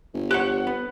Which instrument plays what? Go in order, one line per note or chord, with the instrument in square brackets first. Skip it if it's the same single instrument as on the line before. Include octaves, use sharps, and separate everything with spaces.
[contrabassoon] G1
[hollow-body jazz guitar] G4 C5 C#5 [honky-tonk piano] F#5 F#6
[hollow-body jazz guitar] B3